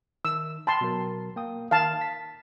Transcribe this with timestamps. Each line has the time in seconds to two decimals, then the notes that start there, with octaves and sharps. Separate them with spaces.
0.25 D#3 E6
0.67 G5 A5 B5 C6
0.81 B2 F#3 A#4
1.36 A#3 G5 D#6
1.71 D#3 F5 A5
2.01 B6